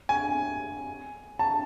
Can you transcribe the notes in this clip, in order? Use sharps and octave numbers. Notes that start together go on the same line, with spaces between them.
G#5
A5